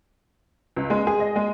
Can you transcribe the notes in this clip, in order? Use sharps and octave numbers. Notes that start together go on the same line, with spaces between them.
C#2
G#3
G#4
D#5
G#3